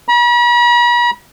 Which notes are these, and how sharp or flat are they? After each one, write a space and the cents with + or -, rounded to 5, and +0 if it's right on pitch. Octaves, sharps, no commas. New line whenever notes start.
B5 -45